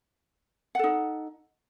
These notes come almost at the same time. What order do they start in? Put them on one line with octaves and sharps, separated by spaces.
F#5 A4 D#4